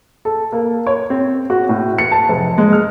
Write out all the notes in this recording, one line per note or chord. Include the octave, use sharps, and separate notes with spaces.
A4
A#3
C#5
C4
F#4
A2
C#7
A5
F1
G#3
F6